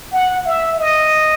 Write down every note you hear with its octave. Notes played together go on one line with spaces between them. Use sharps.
F#5
E5
D#5